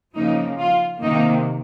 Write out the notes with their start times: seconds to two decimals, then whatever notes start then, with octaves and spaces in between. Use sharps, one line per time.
0.16 C#3 F3 A#3 D#4
0.59 F4
1.02 C3 D#3 A#3 D#4